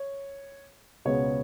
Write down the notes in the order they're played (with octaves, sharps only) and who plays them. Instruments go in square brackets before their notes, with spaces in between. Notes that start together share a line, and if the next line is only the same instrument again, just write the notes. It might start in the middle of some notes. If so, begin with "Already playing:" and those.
Already playing: [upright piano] C#5
C#2 B2 G#3 B3 C#5